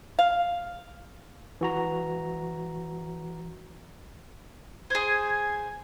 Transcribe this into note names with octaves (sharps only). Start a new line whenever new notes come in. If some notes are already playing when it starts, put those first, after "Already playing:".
F5
E3 F#4 A#5
G#4 C5 G#6